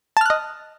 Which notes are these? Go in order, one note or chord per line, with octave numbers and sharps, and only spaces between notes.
D#5 A5 F6 F#6